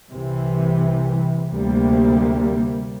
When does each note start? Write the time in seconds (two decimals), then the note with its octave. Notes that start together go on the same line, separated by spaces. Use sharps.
0.12 C2 C3 E3
1.47 D2 C3 G3 A#3